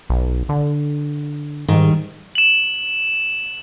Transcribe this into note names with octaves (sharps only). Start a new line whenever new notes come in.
B1
D3
G#2 D#3 G3
E7 F#7